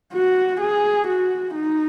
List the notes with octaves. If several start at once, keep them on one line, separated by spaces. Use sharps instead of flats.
F#4
G#4
F#4
D#4